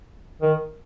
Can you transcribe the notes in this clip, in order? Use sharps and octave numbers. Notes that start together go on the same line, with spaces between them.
D#3